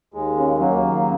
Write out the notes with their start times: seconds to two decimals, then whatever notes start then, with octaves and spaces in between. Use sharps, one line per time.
0.14 D#2 G#3
0.37 C#3
0.60 C#3 F#3 A#3
0.82 D#2